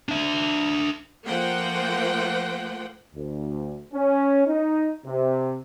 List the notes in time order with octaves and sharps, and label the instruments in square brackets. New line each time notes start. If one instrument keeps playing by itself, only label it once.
[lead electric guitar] D4 E5
[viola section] F3 A3 A#3 C5 F#5 G5
[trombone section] D2
C#4
D#4
C3